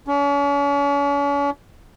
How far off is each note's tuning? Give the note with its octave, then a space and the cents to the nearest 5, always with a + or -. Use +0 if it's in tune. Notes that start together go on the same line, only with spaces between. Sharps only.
C#4 +40